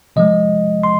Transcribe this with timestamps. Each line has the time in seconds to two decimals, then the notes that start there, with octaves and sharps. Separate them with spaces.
0.16 C3 F3 G#3 D#5
0.83 C6